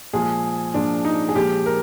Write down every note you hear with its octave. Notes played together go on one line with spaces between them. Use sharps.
A#2 F3 G#3 G#4
A#2 F3 G#3 D4
D#4
G#4
A#2 F3 G#3 G4
A#4